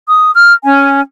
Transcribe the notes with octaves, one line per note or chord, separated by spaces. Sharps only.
D#6
F6
C#4 G#5